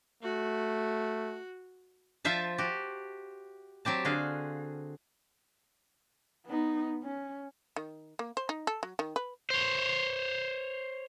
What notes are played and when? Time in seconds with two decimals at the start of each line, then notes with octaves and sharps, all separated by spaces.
0.23 A3 F#4
2.25 F3 F4 C5 E5 A5
2.58 F#4 G4
3.85 F#3 C4 G4 A5
4.05 D3 F#4 G#4 F5
6.46 B3 D#4
7.03 C#4
7.76 D#3
8.19 A#3
8.37 C5
8.49 D#4
8.67 A4
8.83 F#3
8.99 D#3
9.16 B4
9.50 C5 C#5